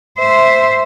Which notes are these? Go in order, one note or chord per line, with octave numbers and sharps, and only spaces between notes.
C5 E5